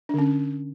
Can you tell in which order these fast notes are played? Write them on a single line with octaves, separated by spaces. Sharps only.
D4 D3 C#4